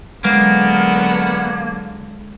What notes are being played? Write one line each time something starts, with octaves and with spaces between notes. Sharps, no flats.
D3 F#3 G#3 A#3 B3 C7 D7